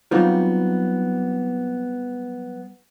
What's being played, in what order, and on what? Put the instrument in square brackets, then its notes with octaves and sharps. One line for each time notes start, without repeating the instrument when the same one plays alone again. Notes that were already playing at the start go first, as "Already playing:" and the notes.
[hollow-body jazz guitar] F#3 G3 B3 C4 D#4 F4